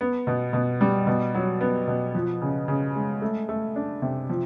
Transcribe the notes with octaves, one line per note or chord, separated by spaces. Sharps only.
B3
B2
B2
G3
B2
F#3
B3
B2
F3
C#3
C#3
G#3
A3
A3
D4
C3
F3